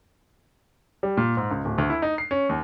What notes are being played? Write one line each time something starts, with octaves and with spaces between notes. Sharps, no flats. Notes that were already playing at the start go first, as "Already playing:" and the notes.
G3
A#2
G#2
C#2
D1
D2
E4
D#4
C7
C#4
D#2